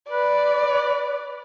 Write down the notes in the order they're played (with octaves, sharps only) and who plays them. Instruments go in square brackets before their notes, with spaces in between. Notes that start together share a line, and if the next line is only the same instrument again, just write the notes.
[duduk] B4 [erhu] D5